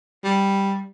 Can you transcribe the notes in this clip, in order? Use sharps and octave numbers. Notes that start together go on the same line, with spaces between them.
G3